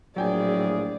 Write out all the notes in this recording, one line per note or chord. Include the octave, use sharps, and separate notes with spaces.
A#1 A2 F#3 G#4 D5 G5 G#5